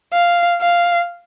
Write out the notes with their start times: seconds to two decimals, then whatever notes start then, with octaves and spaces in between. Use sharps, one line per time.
0.13 F5
0.61 F5